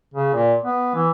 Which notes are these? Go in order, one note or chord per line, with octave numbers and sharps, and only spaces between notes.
C#3
A#2
B3
E3